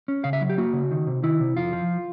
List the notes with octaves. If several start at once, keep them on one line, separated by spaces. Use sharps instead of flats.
C#4
C#3 F5
E5
F#3
G4
A#3 F#4
C#3
D#3
C3
D#3 E4
C3
F2 F4
F3